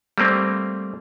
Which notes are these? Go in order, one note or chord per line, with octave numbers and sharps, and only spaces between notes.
G3 A3 A#3 C4